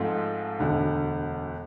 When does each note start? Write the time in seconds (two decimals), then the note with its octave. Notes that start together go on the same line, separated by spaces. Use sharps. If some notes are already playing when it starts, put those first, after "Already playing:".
Already playing: G#2 F3 A3 C4 F4
0.59 E1 D2 D3